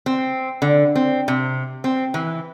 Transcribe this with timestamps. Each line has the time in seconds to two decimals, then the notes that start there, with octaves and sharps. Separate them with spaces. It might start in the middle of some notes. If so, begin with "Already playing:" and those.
0.06 C4
0.62 D3
0.96 C4
1.28 C3
1.84 C4
2.14 E3